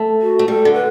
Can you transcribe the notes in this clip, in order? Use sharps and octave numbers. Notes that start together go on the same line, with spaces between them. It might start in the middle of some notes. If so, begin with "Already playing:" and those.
Already playing: A3
F#4
A3
G3 A4
D3
B4